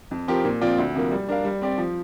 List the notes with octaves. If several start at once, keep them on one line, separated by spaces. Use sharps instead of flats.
F2
F3 C4 G4 A#4
A#2
F3 C4 F4 D5
D2
C3 F3 A#3
G3
D4 A#4 F5
G3
C4 G4 D5
F3